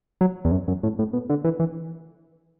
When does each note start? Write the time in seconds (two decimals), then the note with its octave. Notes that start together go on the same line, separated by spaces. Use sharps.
0.21 F#3
0.45 E2
0.51 F#2
0.68 F#2
0.83 A2
0.99 A2
1.13 B2
1.30 D3
1.44 E3
1.59 E3